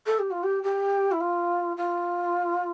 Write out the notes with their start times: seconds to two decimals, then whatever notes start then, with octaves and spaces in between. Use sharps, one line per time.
0.06 A4
0.19 G4
0.30 F4
0.43 G4
0.63 G4
1.11 E4
1.20 F4
1.76 F4